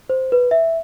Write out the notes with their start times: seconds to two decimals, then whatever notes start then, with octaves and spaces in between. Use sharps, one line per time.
0.10 C5
0.32 B4
0.51 E5